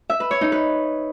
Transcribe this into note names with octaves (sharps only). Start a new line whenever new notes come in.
E5
B4
C#5
D#4
B4